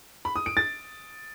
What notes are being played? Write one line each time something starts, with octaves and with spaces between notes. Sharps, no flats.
B5
D#6
D7
A6